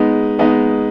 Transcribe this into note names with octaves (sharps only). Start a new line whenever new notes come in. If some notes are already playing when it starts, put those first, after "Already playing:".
Already playing: G#3 B3 D#4
G#3 B3 D#4